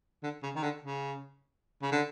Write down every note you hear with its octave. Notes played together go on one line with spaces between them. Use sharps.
D3
C#3
D#3
D3
C#3
C#3
D3